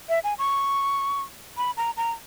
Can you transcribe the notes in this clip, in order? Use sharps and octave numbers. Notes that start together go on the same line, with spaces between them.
E5
G#5
C#6
B5
A#5
A#5